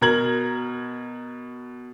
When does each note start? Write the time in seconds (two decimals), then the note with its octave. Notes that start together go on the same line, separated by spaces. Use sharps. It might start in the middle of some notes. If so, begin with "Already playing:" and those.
0.01 B2 A#4 A#5 G#6 F#7